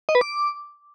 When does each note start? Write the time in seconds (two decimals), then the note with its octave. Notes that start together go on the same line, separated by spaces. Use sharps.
0.09 D#5
0.15 B4
0.21 D6